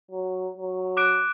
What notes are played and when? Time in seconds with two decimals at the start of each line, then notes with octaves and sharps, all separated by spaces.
0.11 F#3
0.57 F#3
0.97 D6 F#6 D7